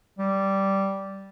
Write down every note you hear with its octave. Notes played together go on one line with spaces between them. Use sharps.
G3